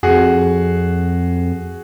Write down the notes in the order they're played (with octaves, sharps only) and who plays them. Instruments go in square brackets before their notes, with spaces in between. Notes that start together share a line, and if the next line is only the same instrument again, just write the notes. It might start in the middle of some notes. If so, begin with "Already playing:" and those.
[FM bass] F2 [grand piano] F#4 G#4